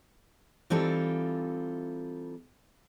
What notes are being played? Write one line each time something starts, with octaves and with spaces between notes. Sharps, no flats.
E3 G3 C4 D#4 F4 A4